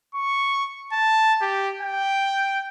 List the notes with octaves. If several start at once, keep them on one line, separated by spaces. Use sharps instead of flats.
C#6
A5
G4
G5